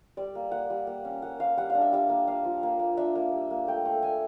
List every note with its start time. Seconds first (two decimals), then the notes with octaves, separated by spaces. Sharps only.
0.17 G3 D5
0.35 A#3
0.51 A#3 F#5
0.70 G3
0.87 A#3
1.05 C#4
1.22 A#3 F#5
1.39 A#3 F5
1.57 G3 F#5
1.70 D4 F5
1.81 E5
1.93 G3 F5
2.09 A#3
2.27 A#3 F5
2.44 F3
2.63 A#3
2.79 A#3
2.97 D4 E5
3.15 A#3
3.32 G3
3.51 A#3
3.67 A3 G5
3.85 A3
4.03 A3 G#5